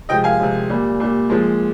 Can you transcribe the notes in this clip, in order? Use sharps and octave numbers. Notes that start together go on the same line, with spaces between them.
C3 F3 G#3 D#5 G5
F5 G#5
C3 F3 G#3
A#2 G3
A#2 G3
A#2 F3 G#3